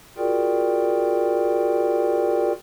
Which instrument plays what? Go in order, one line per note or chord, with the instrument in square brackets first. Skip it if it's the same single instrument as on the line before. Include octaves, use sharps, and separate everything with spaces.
[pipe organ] F4 F#4 G#4 A#4 D5 G5